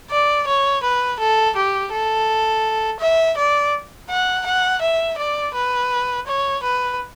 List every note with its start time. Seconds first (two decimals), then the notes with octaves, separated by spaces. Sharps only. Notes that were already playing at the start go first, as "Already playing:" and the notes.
0.10 D5
0.47 C#5
0.83 B4
1.19 A4
1.56 G4
1.92 A4
3.00 E5
3.37 D5
4.10 F#5
4.46 F#5
4.81 E5
5.18 D5
5.54 B4
6.27 C#5
6.63 B4